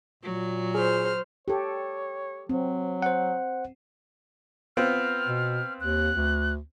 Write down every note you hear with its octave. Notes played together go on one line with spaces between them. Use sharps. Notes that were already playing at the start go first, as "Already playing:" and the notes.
A#2 F#3
G#4 C5 F6
G4 A4 C#5
F#3 C4
C5 F#5
B3 C4 F4 F6
B2
D#2 F#6
D2